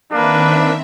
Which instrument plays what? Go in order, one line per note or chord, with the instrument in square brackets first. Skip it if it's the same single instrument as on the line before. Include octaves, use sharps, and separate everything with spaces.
[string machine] D#3 C4 E5 [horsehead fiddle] A#3 B4 [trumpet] D4